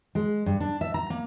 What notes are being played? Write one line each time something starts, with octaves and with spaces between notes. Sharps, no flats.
G#3
G2
D4
E5
A#5
A#3